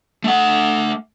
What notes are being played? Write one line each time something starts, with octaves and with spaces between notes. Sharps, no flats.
A3 F#5